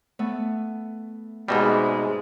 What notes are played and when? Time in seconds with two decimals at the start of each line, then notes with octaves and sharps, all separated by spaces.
0.19 A3 B3
1.48 G#2 B2 G3 G#3 C4 D#5 E5